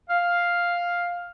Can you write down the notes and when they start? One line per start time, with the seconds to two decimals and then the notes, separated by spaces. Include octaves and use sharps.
0.09 F5